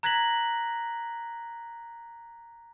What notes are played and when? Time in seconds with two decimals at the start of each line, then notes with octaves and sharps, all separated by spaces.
0.03 A#5 F#6 G#6 A#6 B6 F#7